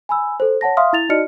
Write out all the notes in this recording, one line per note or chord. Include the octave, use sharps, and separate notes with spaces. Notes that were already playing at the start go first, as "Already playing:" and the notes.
G#5 B5 E6
A4 C5
C#5 F#5 A5 A#6
E5 F5 C6 D#6 F6
E4 A6 F7
D#4 F#4 D5 D#5 F6 C#7